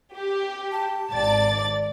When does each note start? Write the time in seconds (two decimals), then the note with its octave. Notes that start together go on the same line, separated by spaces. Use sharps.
0.16 G4
0.72 A5
1.13 G#1 D5 A6